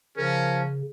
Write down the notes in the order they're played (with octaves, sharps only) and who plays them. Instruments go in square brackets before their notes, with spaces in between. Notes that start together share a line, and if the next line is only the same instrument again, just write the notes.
[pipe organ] C#3 [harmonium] F3 [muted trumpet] C#4 [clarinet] A#4